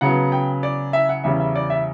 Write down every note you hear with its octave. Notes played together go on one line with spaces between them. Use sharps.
C#3 F#3 B3 F#5
G5
D5
E5
F#5
E2 C#3 G3 C#4 E5
E5
D5
E5